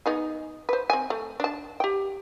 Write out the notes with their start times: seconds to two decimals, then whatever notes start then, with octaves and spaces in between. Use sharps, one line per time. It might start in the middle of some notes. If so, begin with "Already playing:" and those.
0.06 B3 D#4 G#4
0.69 B4 C5
0.90 C4 G#5
1.10 A3
1.40 D4 A5
1.80 G4 G5